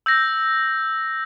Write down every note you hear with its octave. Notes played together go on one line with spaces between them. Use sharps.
E6 G6 A#6